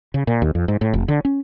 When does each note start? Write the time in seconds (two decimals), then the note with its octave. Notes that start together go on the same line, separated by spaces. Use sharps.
0.14 C#3
0.27 A#2
0.42 D#2
0.55 F2
0.68 G#2
0.81 A2
0.94 F1
1.08 D3
1.25 C#4